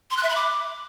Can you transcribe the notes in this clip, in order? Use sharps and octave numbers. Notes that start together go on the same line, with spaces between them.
C6
F#6
E5
B5
D6